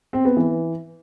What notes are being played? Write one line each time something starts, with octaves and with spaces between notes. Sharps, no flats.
C4
B3
E3